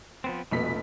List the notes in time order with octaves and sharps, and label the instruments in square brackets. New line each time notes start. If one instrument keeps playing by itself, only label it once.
[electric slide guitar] F3 B3 C4
[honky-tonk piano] F1 A#1 B6 [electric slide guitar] B2